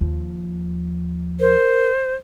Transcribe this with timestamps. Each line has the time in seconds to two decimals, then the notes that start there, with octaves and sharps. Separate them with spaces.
0.01 D#2 F3
1.40 A#4 C5